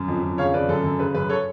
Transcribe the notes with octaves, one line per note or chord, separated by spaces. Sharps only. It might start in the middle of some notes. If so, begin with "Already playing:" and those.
Already playing: F#2
F2
F2
C#3 C#5 F5
C#3 B4 D5
F#2 A4
F#2
C#3 B4
F#2 B4
A4 C#5